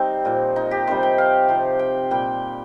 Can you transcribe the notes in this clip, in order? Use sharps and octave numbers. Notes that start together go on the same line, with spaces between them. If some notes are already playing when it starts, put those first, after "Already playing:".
Already playing: G3 C4 D#4
A#2 F3
D#4
G4
C3 D#3 G3 C5
G5
F5
C3 F3
G5
A#2 G3 G5